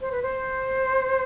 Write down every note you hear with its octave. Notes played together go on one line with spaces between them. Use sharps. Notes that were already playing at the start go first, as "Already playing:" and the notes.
C5
B4
C5